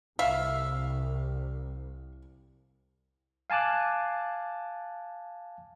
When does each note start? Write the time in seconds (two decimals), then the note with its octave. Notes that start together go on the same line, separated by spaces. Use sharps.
0.19 C2 E5 F5
3.50 F5 G#5 A5 D6 F#6